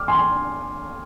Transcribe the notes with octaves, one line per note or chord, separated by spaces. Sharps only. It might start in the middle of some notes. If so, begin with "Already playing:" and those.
Already playing: D6 F6
G#5 C6